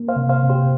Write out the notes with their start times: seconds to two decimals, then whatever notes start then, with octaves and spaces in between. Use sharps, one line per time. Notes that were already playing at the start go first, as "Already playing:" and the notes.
Already playing: A#3
0.08 C5 F5
0.16 C3
0.29 C5 F5
0.43 C3
0.50 G4 C5